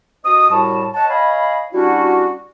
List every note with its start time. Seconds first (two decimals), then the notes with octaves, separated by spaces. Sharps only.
0.25 C4 F#4 D#5 D#6
0.50 C2 A2 G3 F#4 A5
0.94 C#5 D#5 F#5 A5
1.10 C#5 D#5 F5 G#5 B5
1.73 G3 C#4 D4 E4 F#4